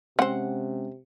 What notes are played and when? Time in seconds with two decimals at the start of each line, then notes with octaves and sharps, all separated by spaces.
0.19 C3 G#3 C4 C#4 C5 F#5